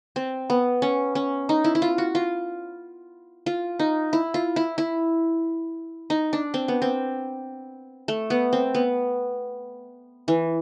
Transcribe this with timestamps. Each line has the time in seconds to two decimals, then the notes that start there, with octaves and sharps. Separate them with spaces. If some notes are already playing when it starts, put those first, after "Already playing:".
0.16 C4
0.50 B3
0.82 C#4
1.15 C#4
1.49 D#4
1.64 E4
1.75 E4
1.82 F4
1.98 F#4
2.15 F4
3.46 F4
3.79 D#4
4.13 E4
4.34 F4
4.56 E4
4.78 E4
6.10 D#4
6.33 D4
6.54 C4
6.68 B3
6.82 C4
8.08 A3
8.30 B3
8.53 C4
8.74 B3
10.28 E3